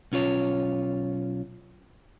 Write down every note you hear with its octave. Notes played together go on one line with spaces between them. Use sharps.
B1 C#4 F4 C#5